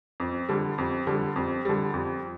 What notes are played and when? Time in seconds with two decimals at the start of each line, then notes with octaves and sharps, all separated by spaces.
0.20 F2
0.49 D3 G3
0.78 F2
1.07 D3 G3
1.36 F2
1.65 D3 G3
1.94 F2